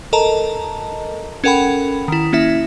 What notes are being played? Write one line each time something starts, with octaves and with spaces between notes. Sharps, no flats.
A4 A#4 D#5 A5 A#5
C#4 A4 A#4 F#5 G5 B5
D#3 E4
A#3 C#4 E4 E5